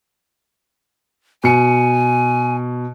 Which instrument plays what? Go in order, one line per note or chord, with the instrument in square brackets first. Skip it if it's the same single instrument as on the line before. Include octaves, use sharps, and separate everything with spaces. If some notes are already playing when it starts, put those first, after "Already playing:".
[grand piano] B2 C#7 [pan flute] G#5